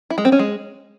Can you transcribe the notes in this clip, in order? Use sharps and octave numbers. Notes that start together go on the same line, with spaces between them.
E4
G#3
C4
C#4
G#3